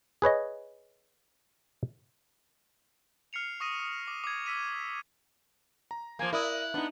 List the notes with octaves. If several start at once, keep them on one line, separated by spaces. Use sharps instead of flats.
G#4 B4 C#5 D#5
F6 C7 C#7 F7
C#6 D#6 A#6 D#7
D#6
D6
D6 G#6
E6 B6 D#7
A#5
F3 A#3 G#5
E4 A#4 D5 D#6 F#6
B3 D4 D#4